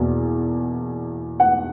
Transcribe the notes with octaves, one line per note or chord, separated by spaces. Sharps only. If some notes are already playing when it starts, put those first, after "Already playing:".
Already playing: E2 B2 A#3
F#5